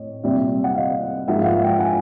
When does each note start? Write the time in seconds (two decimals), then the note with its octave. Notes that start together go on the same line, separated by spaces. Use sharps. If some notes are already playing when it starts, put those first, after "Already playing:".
Already playing: A2 C4 C#5 D#5
0.23 C2 A#2 G3 C4 D5 E5
0.64 F#5
0.75 D#5 F5
1.27 G#2 F3 A#3 E5 F#5
1.41 F5
1.45 E5 F#5
1.62 F5 G5
1.79 F#5 G#5